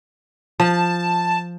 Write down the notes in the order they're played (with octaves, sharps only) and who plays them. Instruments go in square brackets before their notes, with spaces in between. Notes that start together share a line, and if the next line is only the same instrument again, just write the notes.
[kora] F3 [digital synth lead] A5